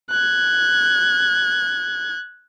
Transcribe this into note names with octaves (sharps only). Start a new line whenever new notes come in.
F#6 G#6